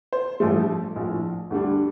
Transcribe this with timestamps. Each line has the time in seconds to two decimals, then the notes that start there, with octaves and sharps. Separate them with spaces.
0.13 C5
0.40 A1 G2 F3 A3
0.96 A#1 A2 F3
1.50 D2 D3 G3 D4